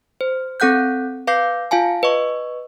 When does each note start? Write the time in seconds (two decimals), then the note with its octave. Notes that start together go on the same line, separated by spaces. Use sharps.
0.21 C5
0.60 C4 A4 F#5 F#6 G6
1.27 B4 F5 D6 G6 C7
1.71 F4 F5 G#5 A5
2.03 B4 D#5 C#6